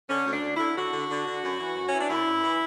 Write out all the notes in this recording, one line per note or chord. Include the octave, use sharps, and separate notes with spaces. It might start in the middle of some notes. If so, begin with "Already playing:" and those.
D3 C#4
D2
D4
D2
E4
D3
D3 F#4
D3
D3
D3
F#2
E3
F#2
E3 C#4
D4
F#2 E4
F#2
E3